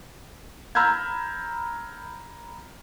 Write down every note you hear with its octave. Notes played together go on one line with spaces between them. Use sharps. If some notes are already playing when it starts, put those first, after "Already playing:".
A#5 B5 E6 F6 G6 G#6